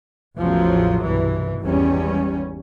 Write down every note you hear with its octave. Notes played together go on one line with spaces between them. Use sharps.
A1 E2 C#3 F3 F#3
C2 G2 B2 E3
G#1 E2 G3 C#4